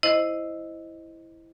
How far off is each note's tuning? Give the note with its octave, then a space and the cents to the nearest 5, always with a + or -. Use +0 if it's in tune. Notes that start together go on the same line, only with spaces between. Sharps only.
E4 +0 C5 +0 D#5 +0